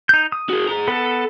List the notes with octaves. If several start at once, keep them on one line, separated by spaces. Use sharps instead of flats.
D#4 G6
D#6
F#4 G#4
G#4 A#5
B3 A4